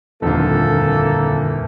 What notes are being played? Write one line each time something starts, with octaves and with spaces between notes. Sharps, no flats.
D#1 F2 D3 E3 A#3 F4 A4